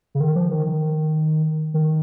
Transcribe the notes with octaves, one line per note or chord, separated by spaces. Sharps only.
C#3
D#3
F3
D#3
D#3
D#3